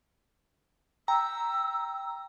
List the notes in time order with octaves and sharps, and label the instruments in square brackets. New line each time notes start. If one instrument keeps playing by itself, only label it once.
[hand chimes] G5 [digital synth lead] A#5 [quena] E6